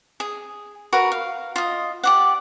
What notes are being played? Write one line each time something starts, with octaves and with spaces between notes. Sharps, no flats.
G#4
F#4 A#4 B4
F5
F4 D#5
G4 D5 F#5